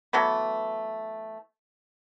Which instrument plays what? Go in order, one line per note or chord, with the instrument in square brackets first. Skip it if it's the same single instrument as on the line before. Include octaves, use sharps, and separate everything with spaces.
[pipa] E3 F#3 A3 B3